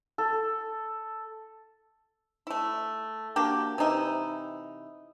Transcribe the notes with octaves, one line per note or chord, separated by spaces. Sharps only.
A4
A3 E4
A#3 D4 F#4 G4
C3 E3 D#4 E4